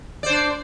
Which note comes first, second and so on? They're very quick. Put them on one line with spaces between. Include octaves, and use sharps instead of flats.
D5 C5 D4